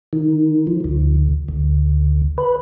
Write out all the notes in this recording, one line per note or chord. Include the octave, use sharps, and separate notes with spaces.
D#3
F3
D2
D2
B4